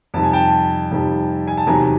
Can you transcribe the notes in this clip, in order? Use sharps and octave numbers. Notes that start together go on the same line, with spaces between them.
F2 C3 D#3 G3 A5
G#5
G5 A5
F2 C3 D#3 G3
G#5
A5
E2 C3 D#3 F#3 G#5 A#5